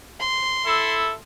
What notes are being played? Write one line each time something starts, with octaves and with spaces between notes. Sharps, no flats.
C6
E4 A4